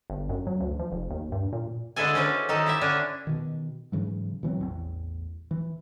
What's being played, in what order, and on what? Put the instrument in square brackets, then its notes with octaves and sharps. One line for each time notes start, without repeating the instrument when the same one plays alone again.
[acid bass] G1
F#2
F#3
D2
F3
F1
D#2
G2
A#2
[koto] D3 G#3 E4 G#4 A4 G#5
C#4 F#4 B4 C5 D5
D#3 D#4 A4
E4 G4 E5
D3 C#4 D4
[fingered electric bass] B2 D#3
G#2 C#3 E3 F#3
B2 E3 F#3 C4
A1 E2
E3